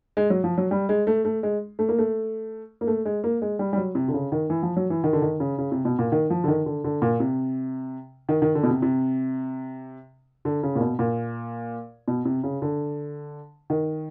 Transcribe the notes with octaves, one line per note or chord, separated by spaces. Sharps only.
G#3
F#3
F3
F#3
G3
G#3
A3
A3
G#3
A3
A#3
A3
A#3
A3
G#3
A#3
G#3
G3
G3
F#3
C3
D3
C#3
D#3
E3
F3
F#3
E3
D#3
D3
D#3
C#3
C#3
C3
B2
A#2
D#3
F3
D3
D#3
D3
D3
A#2
C3
D#3
D#3
D3
B2
C3
C3
D3
C#3
A#2
B2
A#2
B2
C3
C#3
D3
D#3